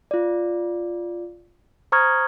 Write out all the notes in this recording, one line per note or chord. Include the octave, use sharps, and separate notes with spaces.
F4 D5
C5 A#5 C#6 D#6 F6 G#6